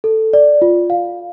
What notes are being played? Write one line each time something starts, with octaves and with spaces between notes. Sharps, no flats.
A4
D5
F4
F5